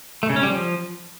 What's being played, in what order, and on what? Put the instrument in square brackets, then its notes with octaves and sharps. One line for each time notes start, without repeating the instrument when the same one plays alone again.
[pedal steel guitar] A3
C#3
C#4
G3
F3